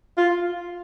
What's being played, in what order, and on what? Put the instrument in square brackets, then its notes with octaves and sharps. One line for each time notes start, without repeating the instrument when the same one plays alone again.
[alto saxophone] F4